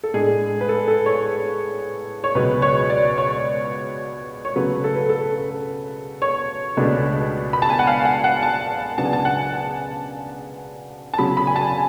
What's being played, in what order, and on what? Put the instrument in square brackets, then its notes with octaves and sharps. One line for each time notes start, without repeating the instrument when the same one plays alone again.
[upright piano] A4
A2 G#3 D4 G#4
B4
A4
A4
C#5
C#5
C#2 B2 F#3 B4
C#5
D5
C#5
C#5
C#3 F#3 A3 B4
A4
B4
A4
C#5
C#2 B2 A3 D4
B5
A5
G#5
F#5
F5
F#5
F#5
A5
C#3 F#3 B3 D4 A5
G#5
A5
F#5
F#5
A5
C#3 F#3 C#4 B5
B5
G#5
A5